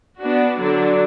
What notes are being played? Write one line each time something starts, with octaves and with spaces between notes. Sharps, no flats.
B3 D4 F#4
D3 F#3 D4